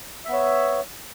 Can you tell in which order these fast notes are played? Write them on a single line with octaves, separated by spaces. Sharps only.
E5 B3 C#5